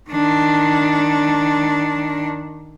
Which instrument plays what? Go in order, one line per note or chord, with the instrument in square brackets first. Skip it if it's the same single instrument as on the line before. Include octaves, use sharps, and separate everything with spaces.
[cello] D#3 D4